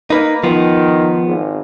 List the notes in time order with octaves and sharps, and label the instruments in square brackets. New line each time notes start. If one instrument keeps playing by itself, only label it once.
[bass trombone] A#3 [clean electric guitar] D#4 B4
[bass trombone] D#3 [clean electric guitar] F3 B3
[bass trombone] G#1